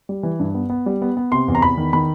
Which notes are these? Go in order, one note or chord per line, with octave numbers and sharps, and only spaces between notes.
G3
E3
G2
B3
B3
G3
B3
B3
C3 C6
E2
A#5
E2 B5
D#3
D#3 B5